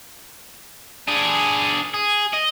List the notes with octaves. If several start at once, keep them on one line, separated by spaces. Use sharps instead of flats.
D4 G#4
G#4
D#5